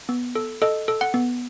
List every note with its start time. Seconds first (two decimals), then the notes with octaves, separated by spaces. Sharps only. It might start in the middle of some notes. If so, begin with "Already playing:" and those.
0.09 B3
0.35 A4
0.62 A4 D#5
0.88 A4
1.01 F#5
1.14 B3